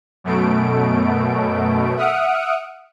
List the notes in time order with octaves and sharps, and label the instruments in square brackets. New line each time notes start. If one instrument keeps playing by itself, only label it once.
[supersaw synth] F#2 B2 A3 D7
E5 F#5 D#6 F6 C#7 D7